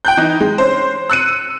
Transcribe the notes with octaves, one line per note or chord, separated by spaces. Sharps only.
G5 F#6 G6
E3 D#4
G#3
C#4 C5
E6 F#6 C#7 D#7